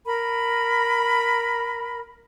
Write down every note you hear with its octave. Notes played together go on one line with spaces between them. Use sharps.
A#4 B5